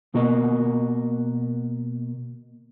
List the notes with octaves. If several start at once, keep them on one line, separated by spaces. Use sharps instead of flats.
B2 A#3 F#4 A#4 B4 D#5